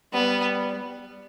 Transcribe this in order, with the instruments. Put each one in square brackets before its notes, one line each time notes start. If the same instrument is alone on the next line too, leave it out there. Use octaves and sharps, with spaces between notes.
[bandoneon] G3 [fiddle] B3